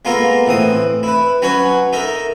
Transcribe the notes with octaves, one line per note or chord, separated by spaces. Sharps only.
G#3 A#3 B3 F4 A4 A#4
A2 E3 C4 D#6
E4 B4
F#3 C#4 F#4 B4 C#5
D#4 A4 A#4 E5